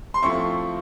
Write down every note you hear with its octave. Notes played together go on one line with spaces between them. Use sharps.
C6
F3 A3 C4 E4 C#6